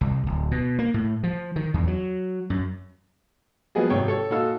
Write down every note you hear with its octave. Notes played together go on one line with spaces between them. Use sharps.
C2
D1
B2
A#3
A2
F3
D#3
E2
F#3
F#2
F3 F#3 A#3 B3 G#4 D#5
G#1 C3 C#5 G5
A4 C#5
A#2 D#4 F#4 A4 F5 E6